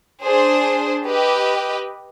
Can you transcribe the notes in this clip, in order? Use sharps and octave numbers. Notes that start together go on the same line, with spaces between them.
D4 G#4 C5
G4 B4 D#5